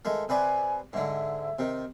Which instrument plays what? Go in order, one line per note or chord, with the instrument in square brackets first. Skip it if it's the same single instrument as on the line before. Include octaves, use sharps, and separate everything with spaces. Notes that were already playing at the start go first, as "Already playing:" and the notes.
[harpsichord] D#3 G#3 A3
[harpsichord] C3 B4 D5 [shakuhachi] G#5
[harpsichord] G#2 D3 [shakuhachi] E5
[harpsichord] C3 D#3